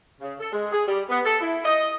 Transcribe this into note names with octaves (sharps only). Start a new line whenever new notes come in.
C#3
A4
G#3
G#4
G3
B3
A4
E4
D#5